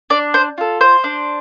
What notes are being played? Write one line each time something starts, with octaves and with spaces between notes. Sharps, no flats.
D4 D5
C5
F4 A4
C5
D4